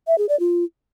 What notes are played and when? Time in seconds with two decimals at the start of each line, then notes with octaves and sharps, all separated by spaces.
0.07 E5
0.18 G#4
0.29 D5
0.40 F4